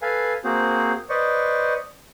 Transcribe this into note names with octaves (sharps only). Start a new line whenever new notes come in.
A4 B4 F5 G#5
A#3 C4 F#4 G#4 C5
B4 C5 D5 D#5 C#6